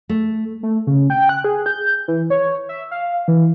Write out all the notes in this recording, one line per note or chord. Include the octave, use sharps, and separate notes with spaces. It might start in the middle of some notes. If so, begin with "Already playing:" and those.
A3
A3
C#3
G5
F#6
G#4
G6
E3
C#5
E5
F5
E3